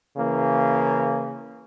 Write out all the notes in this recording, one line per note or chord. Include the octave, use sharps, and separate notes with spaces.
C#3 E3 A#3